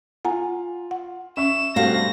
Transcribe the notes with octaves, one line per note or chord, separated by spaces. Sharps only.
F4 F#5 G#5 A#5
F#5
C#4 E5 C#6 E7
G2 B2 A3 C4 F#4 F5 A#6